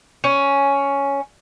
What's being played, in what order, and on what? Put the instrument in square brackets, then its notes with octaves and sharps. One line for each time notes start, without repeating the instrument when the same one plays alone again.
[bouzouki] C#4